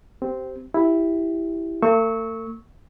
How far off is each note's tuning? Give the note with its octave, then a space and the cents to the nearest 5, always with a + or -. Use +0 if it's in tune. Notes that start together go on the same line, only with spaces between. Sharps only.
C4 -10 G4 -20
E4 +0 G4 +0
A3 +45 C#6 +0 E6 -30